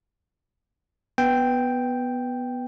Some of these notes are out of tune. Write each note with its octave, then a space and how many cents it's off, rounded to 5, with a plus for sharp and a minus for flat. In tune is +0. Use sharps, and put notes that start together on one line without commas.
B3 +0 G5 +0